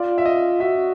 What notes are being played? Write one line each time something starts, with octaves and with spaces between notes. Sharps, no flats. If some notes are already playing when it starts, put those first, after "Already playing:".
Already playing: F4 D5
E5
D#5
F#4 E5